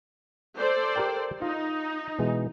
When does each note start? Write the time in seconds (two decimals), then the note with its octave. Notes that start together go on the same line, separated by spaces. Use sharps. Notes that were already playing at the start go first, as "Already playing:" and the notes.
0.57 A4 C5 D5
0.96 G4 A#4 G5
1.42 D#4 F4
2.19 B2 E3 G#3